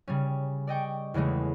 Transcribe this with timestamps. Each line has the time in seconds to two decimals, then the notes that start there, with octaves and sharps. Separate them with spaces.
0.08 C#3 G3 C#4
0.67 D5 D#5 G5 C#6
1.14 E2 C#3 E3 G#3 A3